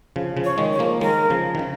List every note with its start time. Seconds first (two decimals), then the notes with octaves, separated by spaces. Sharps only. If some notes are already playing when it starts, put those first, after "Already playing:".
0.16 C#3 F3
0.37 C#3 F3
0.44 C#5
0.58 D#3 G#3
0.73 C#5
0.79 F3 A#3
1.01 D#3 G#3 A#4
1.30 C#3 F3
1.55 D#3
1.59 C#3